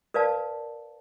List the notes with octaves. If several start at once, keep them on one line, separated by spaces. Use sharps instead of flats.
A#4 B4 D5 F5 A5